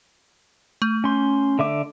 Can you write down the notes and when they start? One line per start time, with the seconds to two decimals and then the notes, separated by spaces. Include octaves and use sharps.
0.82 A3
1.04 C#4 C6
1.59 D3 E5 D6